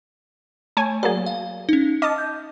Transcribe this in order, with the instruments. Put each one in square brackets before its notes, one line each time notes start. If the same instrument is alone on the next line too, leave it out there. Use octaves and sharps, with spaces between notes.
[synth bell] A3 [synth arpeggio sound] C#5 G#5 A5
[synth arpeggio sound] F#3 A#3 G#4 [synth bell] D5
[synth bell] F5
C#4 D#4
[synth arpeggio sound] D#5 A5 [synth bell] D6 F6
[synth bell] G6